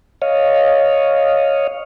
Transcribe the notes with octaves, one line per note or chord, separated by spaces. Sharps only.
C#5 D#5 F5